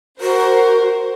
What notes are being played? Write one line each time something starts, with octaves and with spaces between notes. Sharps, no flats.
F#4 A#4 C5